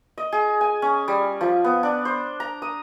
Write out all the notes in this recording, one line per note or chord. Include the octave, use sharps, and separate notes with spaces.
D#5
G#4
G#5
C#4
G3
F3
B3
D4
C5
A#5
D#6